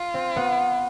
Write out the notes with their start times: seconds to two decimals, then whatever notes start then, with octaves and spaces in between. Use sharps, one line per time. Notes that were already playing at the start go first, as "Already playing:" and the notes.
Already playing: F4
0.14 C4
0.36 B3